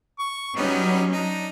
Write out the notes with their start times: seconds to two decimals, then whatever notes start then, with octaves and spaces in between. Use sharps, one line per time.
0.19 C#6
0.56 F#3 G3 B3 C#4 D#4
1.12 D4 D#4